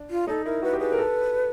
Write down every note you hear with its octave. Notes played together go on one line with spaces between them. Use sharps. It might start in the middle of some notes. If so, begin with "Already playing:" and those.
Already playing: D4
F4
D#4 A4
E4 A#4
F#4 B4
G4
G#4 B4
A#4
A4